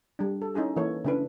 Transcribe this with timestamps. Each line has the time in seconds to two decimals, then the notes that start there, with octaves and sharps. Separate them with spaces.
0.19 G3 D4
0.42 A4
0.54 C#4 D#4 E4 G#4 A4
0.76 E3 A#3 A4 C#5
1.05 C#3 A3 D4 E4 B4